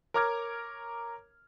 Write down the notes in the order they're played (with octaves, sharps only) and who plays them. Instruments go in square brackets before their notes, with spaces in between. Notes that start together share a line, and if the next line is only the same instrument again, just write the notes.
[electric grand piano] A#4 C#5 A#5 D6 F6 G#6